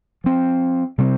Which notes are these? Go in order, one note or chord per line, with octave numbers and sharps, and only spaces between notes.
F3 C4
C3 G3 C4